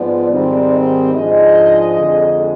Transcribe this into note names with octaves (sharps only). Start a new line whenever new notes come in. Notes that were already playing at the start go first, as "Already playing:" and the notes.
Already playing: G#2 F3 B3 D5
G#2 D#3 G3 C4 D#4 D5
D#5
G#2 F3 G#3 D4 D#5
F2 D3 G#3